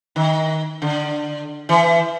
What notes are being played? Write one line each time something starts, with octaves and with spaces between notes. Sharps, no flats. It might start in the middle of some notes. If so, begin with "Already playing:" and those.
D#3
D3
E3